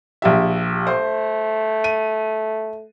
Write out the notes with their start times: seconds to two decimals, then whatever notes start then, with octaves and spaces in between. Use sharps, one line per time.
0.22 A#1 G4 E5
0.87 A3 C5
1.84 D#7